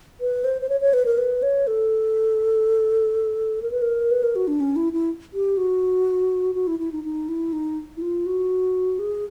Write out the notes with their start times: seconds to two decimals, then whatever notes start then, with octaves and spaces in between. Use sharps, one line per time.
0.21 B4
0.44 C5
0.61 C5
0.69 C#5
0.81 C#5
0.93 B4
1.05 A#4
1.18 B4
1.42 C#5
1.67 A4
3.62 A#4
3.71 B4
3.82 A#4
4.11 B4
4.23 A#4
4.35 F#4
4.47 D4
4.60 C#4
4.76 E4
4.93 E4
5.33 G4
5.57 F#4
6.55 F#4
6.67 E4
6.79 E4
6.92 D#4
7.04 D#4
7.28 E4
7.53 D#4
7.97 E4
8.02 F4
8.26 F#4
8.99 G#4